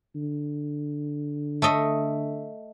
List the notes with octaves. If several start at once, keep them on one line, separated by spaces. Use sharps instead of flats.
D3
A3 A4 D#5